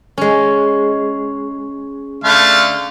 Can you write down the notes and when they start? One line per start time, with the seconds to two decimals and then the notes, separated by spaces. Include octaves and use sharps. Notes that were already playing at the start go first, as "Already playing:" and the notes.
0.18 G#3 C#4
2.24 D3 A3 F5